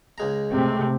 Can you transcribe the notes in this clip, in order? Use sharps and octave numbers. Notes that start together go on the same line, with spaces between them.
C#2 G#3 A#5
C3 A3 C4